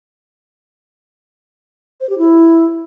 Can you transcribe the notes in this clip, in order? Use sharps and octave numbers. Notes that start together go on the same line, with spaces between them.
C5
G4
E4